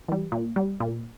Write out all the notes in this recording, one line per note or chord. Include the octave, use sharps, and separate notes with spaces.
E3 G3
A#2
G3
A#2